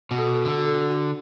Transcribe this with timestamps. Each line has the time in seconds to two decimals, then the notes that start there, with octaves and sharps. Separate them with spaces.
0.11 B2 F#4
0.18 A4
0.27 F#4
0.35 A4
0.42 F#4
0.45 D3
0.50 A4
0.58 F#4
0.66 A4
0.74 F#4
0.81 A4
0.90 F#4